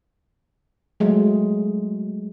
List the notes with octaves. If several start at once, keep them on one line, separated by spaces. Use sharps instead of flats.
F#3 G#3 A3